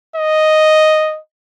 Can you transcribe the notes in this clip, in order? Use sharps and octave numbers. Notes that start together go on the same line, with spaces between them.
D#5